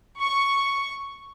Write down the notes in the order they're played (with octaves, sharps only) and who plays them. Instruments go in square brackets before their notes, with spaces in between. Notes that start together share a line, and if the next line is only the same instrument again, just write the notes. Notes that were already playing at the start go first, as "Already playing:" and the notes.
[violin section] C#6